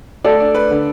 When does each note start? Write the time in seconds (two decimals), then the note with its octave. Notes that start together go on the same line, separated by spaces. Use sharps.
0.24 A3 A4 D5
0.40 D4
0.55 B4
0.71 D3